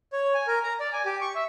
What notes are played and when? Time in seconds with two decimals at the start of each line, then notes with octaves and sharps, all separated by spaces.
0.13 C#5
0.34 G#5
0.47 A#4
0.63 A#5
0.80 D5
0.92 G#5
1.05 G4
1.21 C#6
1.35 E5